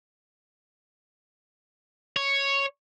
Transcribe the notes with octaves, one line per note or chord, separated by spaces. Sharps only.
C#5